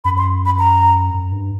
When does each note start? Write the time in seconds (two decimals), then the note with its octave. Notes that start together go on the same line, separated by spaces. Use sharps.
0.05 F#2 B5
0.18 C6
0.45 B5
0.59 A#5
1.14 F#2
1.32 G2